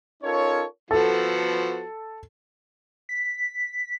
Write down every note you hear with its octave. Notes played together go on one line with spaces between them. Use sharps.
C#4 D#4 F4 A4 A#4 C#5
F3 B3 F#4 A4
B6